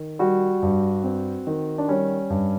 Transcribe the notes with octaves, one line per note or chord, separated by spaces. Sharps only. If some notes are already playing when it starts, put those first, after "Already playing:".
Already playing: D#3
G3 F#4
G2
C4
D#3
D4
G3 C#4
G2